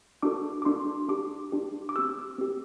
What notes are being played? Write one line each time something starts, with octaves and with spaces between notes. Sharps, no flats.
D4 F#4 A4 D6
D6
D4 F#4 A4 C6
D4 G4 D6
D4 G4
D6
C4 G4 E6
C4 G4